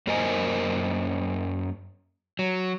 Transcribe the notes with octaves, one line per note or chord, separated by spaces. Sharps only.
F#2 A#3 A#4 C5 D#5 G#5
F#3